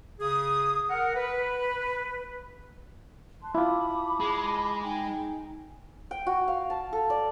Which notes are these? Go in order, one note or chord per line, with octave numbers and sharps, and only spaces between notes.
C#3 G#4 D#6
A#4 F#5
B4
A5 C6 F#6
E4 F4 A5 B5 D6 D#6
G#3
D#4 G5 G#5
G5
F#4
F5
A5
A4
D5